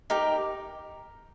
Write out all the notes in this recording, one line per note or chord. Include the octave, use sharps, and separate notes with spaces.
D#4 G4 A#4